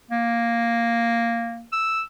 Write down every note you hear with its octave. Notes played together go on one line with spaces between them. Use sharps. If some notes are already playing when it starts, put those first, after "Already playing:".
A#3
E6